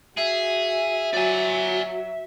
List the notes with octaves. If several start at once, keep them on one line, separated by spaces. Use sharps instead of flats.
F#4 G#4 E5
F#3 D5 G#5